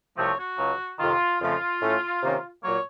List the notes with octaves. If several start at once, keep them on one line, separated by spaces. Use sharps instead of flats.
C2 C3 F3 A3 C4 C#5
F#4
C#2 C#3 F#3
F2 C3 D#3 F4
F2 C#3 F3 A3 F4
A2 A3 C#4
C3 D#3 A#3 C#4
A#2 F#3 A#3 C#5